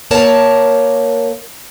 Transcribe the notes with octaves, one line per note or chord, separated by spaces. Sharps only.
A#3 A#4 C#5 A5